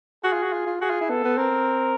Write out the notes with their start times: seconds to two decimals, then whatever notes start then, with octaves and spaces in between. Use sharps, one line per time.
0.24 F#4 G#4
0.33 F4
0.43 F#4
0.53 F4
0.67 F4
0.81 F#4 G#4
0.90 F4
1.01 E4
1.10 B3 A4
1.24 B3
1.38 C4 A#4